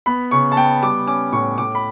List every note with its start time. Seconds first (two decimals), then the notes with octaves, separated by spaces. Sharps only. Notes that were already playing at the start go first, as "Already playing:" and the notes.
0.06 B3 B5
0.31 C#3 C#6
0.52 A5
0.56 B3 G5
0.83 G3 D6
1.07 C#4 D6
1.32 A2 C#6
1.58 A2 D6
1.75 B5